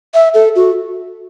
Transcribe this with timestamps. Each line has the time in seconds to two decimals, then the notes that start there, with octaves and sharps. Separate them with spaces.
0.14 E5
0.34 A4
0.56 F#4